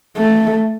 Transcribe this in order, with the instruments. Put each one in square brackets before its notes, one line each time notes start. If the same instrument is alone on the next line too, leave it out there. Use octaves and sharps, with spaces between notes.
[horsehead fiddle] A3